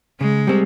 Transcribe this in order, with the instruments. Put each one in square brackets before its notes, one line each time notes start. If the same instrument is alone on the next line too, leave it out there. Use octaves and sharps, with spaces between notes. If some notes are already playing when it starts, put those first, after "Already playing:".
[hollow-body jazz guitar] C#3 [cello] G#3
[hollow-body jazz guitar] G3 C4